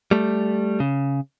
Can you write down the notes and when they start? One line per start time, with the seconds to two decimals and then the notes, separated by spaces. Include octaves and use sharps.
0.11 G3 A3
0.80 C#3